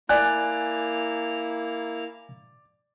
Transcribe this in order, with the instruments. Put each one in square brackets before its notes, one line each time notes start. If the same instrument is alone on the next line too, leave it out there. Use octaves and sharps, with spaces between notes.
[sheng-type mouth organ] A#3 E4 A#5 [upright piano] D5 [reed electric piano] G#5 F#6